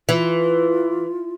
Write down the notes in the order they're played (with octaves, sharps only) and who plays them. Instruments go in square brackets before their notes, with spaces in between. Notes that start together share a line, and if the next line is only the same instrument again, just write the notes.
[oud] E3 [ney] F4